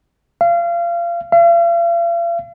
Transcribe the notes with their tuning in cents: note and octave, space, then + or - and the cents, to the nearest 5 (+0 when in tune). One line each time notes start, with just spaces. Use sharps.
F5 -30
F5 -45